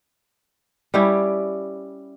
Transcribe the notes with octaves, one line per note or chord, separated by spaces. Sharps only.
G3 C#4 E4 G4